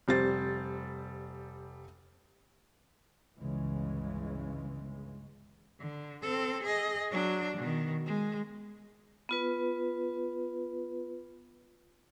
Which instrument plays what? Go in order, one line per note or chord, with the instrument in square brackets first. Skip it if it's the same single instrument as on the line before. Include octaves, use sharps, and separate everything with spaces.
[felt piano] F1 G3 C5 A6
[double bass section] G1 C#2 C#3 E3 G#3
[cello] D3
C4 A4
G#4 D#5
F#3 D4
B2 D#3
G#3
[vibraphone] B3 F4 B4